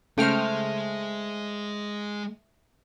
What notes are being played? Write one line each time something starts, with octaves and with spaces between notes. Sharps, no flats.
C#3 G#3 A3 C5 G5 F6